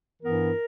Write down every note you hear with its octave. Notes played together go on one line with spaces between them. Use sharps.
G2 E3 B3 E4 A#4